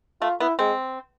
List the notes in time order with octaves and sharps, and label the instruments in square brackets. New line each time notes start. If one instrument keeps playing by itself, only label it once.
[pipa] A3 [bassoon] F4
[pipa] B3 [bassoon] E4
[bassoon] G#3 [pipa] C4